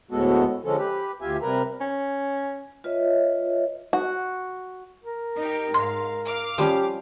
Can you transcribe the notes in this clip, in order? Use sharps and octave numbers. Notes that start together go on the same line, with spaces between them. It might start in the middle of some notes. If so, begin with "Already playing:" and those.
D2 A2 G#3 B3 F#4 A4
D3 F3 G#3 C#4 A4
G4 B4
D2 F4 G4 E5 G#5
C3 G3 A#4 B4 A#5
C#4
F4 B4 C#5 D#5 E5
F#4
A#4
D#4 G4
G#2 F5 C6
F5 D6 F6
F3 G3 C#4 G4